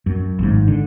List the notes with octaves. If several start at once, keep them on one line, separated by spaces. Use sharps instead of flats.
F#2
G#1 G#2
D3